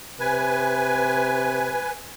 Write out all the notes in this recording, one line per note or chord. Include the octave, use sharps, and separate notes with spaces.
C3 B4 G#5